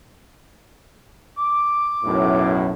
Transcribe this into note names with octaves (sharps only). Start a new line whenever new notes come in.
D6
B1 F#2 A2